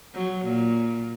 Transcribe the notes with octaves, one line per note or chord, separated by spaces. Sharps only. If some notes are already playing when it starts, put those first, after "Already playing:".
F#3
A#2